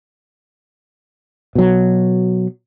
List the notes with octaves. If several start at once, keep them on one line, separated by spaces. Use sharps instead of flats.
B2 F#3